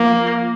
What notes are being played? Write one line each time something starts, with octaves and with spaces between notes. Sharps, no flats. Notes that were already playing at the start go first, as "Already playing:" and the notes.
Already playing: F3 A#3